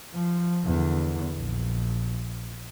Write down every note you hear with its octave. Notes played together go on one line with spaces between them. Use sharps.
F3
E2 D3
A#1